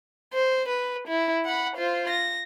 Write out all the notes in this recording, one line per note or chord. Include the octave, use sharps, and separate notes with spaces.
C5
B4
E4
F#5 B5
F4 C5
A#6